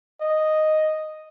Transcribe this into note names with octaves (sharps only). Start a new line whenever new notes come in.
D#5